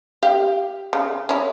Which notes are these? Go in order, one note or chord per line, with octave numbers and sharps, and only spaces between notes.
G4 F5
C#3
C#4 E4